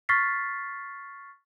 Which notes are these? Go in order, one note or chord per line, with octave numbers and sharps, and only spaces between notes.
C#6 F6 A6 B6 C7